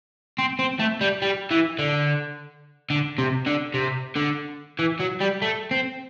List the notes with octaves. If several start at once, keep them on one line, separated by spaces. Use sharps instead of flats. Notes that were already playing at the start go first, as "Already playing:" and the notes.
C4
C4
A3
G3
G3
E3
D3
D3
C3
D3
C3
D3
E3
F#3
G3
A3
C4